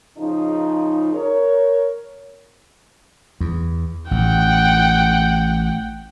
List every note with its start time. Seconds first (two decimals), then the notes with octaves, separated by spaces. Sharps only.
0.17 C#3 F3 D#4
1.13 A#4 C#5
3.41 E2
4.11 A1 F#5 G5